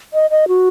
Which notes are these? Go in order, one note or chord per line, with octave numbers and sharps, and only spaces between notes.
D#5
D#5
F#4